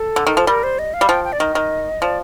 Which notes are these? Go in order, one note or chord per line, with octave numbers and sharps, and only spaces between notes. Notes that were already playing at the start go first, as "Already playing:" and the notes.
Already playing: A4
D3
D#3
F3
G3 A#4
C5
D#5
F5
G3
F3 G5
G5
D5
D#3 D#5
D#3
F3 D5